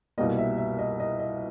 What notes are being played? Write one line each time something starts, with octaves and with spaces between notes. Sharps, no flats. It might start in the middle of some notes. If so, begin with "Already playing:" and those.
C2 B2 G3 A#3 D#5
E5
E5
D#5
D#5
D#5